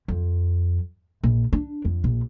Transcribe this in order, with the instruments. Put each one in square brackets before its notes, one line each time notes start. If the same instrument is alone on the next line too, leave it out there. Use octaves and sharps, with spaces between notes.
[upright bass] F2
A#1
D4
F2
A#1